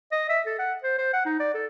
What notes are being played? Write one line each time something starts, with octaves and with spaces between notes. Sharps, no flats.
D#5
E5
A4
F#5
C5
C5
F#5
D#4
D5
A4